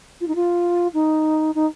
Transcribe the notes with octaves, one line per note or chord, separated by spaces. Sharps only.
F4
D#4
F4
D#4
D#4